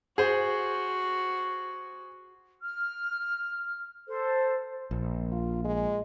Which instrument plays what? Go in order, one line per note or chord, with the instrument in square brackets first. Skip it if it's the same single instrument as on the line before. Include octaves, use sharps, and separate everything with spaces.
[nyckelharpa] F#4 [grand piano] G#4 C5
[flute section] F6
A4 C5
[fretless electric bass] A#1
[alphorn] F4
G#3